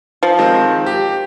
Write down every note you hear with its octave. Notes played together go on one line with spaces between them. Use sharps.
F3
D#3 G#3 C4
G4